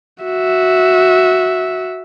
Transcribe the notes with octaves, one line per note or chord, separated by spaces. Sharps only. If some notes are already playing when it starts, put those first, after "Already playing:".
F#4 E5